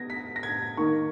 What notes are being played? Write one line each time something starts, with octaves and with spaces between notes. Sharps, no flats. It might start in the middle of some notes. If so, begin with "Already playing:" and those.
Already playing: B3 G#6 A#6
B6
A#6
G#6
D#3 A#3 D#4 C#6